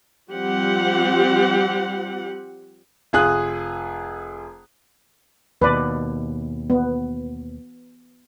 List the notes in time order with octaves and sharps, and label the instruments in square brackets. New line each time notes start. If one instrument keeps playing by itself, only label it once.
[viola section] F3 G3 C4 G4 F#5
[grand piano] F1 F4 G#4 D#6 F#6
[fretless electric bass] D#2 B2 [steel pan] B4 D5
[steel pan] B3